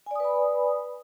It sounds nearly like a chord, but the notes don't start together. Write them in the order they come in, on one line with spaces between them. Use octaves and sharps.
G#5 D5 D#6 B4 B5